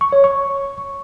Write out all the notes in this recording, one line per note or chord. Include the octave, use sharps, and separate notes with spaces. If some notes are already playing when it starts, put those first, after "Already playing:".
C#6
C#5
C#6